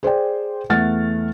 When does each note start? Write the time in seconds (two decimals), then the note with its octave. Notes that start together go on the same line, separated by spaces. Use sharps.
0.03 G#4 C5 D5 G5
0.70 E2 A3 F#5 F6 A6